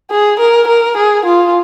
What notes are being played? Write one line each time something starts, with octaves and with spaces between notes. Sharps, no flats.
G#4
A#4
A#4
G#4
F4